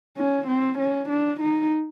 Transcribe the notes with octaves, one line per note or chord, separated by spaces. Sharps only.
C#4
C4
C#4
D4
D#4